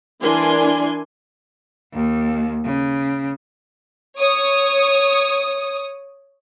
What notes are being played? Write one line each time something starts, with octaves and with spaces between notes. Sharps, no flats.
E3 D4 A#4 D5 G#5 C6
D#2
C#3
C#5 D#6